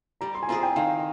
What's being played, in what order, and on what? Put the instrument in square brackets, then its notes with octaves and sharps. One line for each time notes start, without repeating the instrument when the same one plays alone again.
[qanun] G3 [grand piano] A#5
[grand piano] C6
G#5
[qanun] C4 F4 G#4 [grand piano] A#5
[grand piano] G5
[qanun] D#3 [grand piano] F5